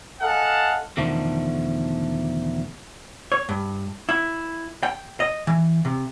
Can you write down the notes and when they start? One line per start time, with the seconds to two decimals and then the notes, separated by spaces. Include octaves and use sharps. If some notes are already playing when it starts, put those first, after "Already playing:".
0.21 A4 D#5 F5 F#5 G#5 A5
0.97 E2 B2 D3 D#3 F3 A3
3.32 C#5
3.49 G2
4.09 E4
4.83 G5
5.20 D#5
5.47 E3
5.85 C3